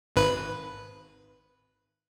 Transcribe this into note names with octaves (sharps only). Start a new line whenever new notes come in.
G#1 B4